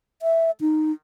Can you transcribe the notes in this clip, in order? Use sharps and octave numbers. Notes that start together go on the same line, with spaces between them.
E5
D#4